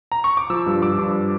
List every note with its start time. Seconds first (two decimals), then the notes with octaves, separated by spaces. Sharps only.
0.12 A#5
0.24 C#6
0.37 D6
0.50 F3 E6
0.66 G2
0.82 F3 D6
0.99 G2